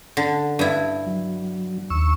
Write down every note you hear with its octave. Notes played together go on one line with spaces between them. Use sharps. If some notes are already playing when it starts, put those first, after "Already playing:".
D3
G2 E4
F#3
D#2 C#6 E6